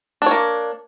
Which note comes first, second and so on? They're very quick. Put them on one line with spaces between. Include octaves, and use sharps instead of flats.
D4 C#5 A#3